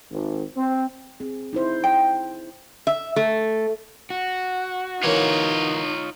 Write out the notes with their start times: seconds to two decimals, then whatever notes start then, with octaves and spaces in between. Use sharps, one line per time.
0.12 G#1
0.57 C4
1.20 C4 G#4
1.53 D#4 E4 C5
1.84 G5
2.87 E5
3.16 A3
4.10 F#4
5.03 E3 A#3 C#4 D#4 F4 C#5